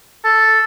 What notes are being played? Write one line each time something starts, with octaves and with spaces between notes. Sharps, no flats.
A4